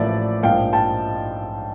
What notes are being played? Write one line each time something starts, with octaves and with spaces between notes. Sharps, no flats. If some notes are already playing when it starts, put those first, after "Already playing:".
Already playing: A1 A2 F3 A#3 D5 E5
A#1 G#2 F3 A#3 F5 G5
G5 A5